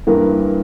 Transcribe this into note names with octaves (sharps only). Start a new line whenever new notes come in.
G2 E3 A#3 A#4